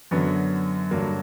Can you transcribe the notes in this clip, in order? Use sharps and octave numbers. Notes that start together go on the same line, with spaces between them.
F#2 D3 F#3 B3
G2 D3 F#3 A#3